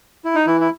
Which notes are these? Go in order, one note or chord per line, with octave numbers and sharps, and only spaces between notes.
E4
D#4
E3 E4
E4